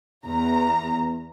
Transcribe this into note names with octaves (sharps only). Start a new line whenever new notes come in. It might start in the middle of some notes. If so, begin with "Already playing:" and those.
E2 A#5